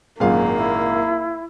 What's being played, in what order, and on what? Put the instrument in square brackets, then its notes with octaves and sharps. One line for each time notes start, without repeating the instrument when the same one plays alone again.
[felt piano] G#1 F#2 A#2 [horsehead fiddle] A#3 [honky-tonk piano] G#4 F5
[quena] E4